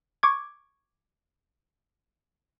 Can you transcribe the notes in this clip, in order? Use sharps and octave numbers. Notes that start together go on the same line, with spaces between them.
C#6 D6 G#6